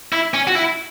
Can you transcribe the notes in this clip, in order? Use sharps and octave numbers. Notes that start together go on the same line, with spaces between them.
E4
C#4
F#4
E4